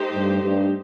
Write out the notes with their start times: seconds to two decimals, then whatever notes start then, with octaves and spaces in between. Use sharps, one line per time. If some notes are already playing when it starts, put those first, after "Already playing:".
Already playing: A3 D#4 G4 C5
0.14 G2
0.42 G2